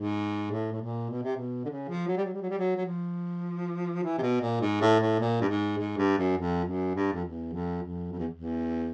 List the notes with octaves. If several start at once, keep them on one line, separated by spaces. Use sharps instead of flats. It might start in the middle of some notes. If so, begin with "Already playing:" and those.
Already playing: G#2
A2
A2
A#2
B2
C3
B2
D3
C#3
F3
F#3
G3
F#3
G3
F#3
G3
F#3
F#3
F3
E3
C3
B2
A#2
G#2
A2
A2
A#2
G2
G#2
G#2
G2
F#2
F2
F#2
G2
F2
E2
F2
F2
F2
E2
E2